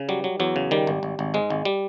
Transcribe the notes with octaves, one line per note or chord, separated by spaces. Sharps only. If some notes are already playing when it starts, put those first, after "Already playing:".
Already playing: C#3
F#3 G3
F#3
E2 F#3
C#3
D#3 G3
G#1
G#1
G#1
G#2 G#3
G#1
G3